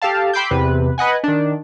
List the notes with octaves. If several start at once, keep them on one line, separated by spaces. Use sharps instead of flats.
G4 A4 F5 A5
G5 B5 C6 D6 E6 G6
E2 C3 B4
B4 D#5 F#5 G#5
D#3 D4